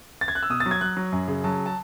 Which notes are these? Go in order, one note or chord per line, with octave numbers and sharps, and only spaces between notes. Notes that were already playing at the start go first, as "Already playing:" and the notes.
A6
G#6
F#6
E6
B2 D#6
A6
F#3
G#6
F#3 F#6
F#3
F#2
C#3
F#3 A5
A5